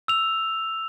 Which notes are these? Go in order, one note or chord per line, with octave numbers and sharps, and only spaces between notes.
E6 F7